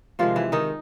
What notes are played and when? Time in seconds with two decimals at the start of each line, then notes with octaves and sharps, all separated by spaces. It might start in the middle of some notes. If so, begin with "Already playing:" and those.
0.19 C3 D#3 F3 G#3 F4
0.36 E3 E4
0.52 D#3 D#4